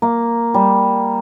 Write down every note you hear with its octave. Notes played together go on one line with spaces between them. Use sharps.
A#3
G3